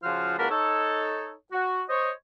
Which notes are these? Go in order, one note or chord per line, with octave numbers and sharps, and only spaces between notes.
C#3 F3 F4 F#4 C5 F6
C#2 A#3 F#4 A#4 A5 B5
D#4 A4 C#5
F#4
C5 C#5 D#5